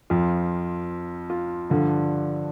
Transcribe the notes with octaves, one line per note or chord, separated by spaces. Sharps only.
F2 F3 F4
F4
G2 D3 F3